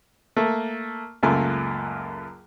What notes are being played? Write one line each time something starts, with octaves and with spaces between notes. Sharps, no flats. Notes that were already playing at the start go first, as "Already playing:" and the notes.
A3 A#3
C#2 F#2 A3 A#3 F4 G#5